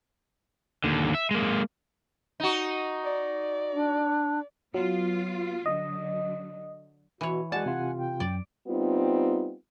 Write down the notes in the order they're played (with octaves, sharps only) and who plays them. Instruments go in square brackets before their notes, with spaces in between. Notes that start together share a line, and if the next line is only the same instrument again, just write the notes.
[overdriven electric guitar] D#2 D3
E5
G#3 A#3
[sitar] D#4 F#4
[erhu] D5
[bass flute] D4
[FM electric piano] F#3 [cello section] B3 F4
[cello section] D3 F#3 [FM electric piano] D#5
[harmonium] B2 [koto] E3 C#5
[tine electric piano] G#3 F#4 D5 [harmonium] F#5 G#5 [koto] A5
[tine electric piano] C3 F4
[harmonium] G5
[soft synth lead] F#2 [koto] D5
[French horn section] G3 B3 C4 D#4 F4